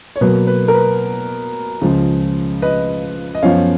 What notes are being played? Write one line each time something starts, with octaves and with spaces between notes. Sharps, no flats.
C#5
B2 F#3 A#3 B4
B4
A#4
B4
C#2 C#3 F3
B4 D#5
D#5
F#2 F3 B3 C#5 F5